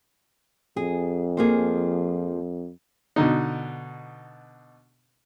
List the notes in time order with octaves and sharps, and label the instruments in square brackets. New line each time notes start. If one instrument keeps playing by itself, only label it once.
[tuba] F2 [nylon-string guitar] G#4
[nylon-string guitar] F3 A#3 G#4
[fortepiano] B2 D3 D#4